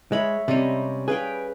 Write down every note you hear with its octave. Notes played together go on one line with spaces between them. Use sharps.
G#3 C#5 E5 B5
C3 G3 G#3 C#4
G#4 B4 F5 G5